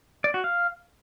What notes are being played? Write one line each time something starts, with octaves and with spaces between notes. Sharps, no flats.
D5
F#4
F5